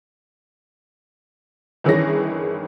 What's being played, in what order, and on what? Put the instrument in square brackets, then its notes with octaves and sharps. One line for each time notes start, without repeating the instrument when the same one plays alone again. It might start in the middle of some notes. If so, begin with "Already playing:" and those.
[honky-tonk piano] G1 D#3 E3 C#4 G#4 A#6